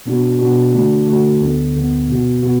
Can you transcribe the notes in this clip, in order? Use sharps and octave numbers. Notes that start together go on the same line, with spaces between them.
B2 B3 D4 F#4
B2 B3 D4 F#4
D3 A3 D4 F#4
D3 A3 D4 F#4
D2 D3 B3
D2 D3 B3
B2 B3 F#4
B2 B3 F#4